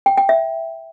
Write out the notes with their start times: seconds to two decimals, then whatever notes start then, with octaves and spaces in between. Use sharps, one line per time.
0.06 G5
0.18 G5
0.29 E5